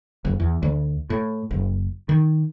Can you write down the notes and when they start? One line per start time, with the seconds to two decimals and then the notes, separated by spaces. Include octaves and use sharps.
0.25 F#1
0.40 E2
0.63 D2
1.10 A2
1.51 F#1
2.09 D#3